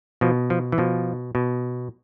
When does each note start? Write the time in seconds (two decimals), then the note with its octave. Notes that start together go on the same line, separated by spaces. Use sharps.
0.21 B2 F3
0.50 F3
0.72 E3
0.78 B2 F3
1.35 B2